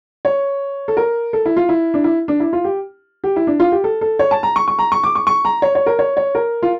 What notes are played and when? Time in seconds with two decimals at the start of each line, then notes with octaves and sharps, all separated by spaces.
0.25 C#5
0.88 A4
0.97 A#4
1.33 A4
1.46 E4
1.57 F4
1.69 E4
1.94 D4
2.04 E4
2.28 D4
2.40 E4
2.53 F4
2.64 G4
3.24 G4
3.36 E4
3.47 D4
3.60 F4
3.72 G4
3.84 A4
4.01 A4
4.19 C#5
4.31 A5
4.43 A#5
4.56 C#6
4.68 C#6
4.79 A#5
4.92 C#6
5.04 D6
5.15 C#6
5.27 C#6
5.45 A#5
5.62 C#5
5.75 C#5
5.86 A#4
5.99 C#5
6.17 C#5
6.35 A#4
6.62 F4